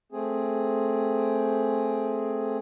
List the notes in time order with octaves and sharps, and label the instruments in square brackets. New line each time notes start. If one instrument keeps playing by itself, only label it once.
[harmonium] A3 C4 G#4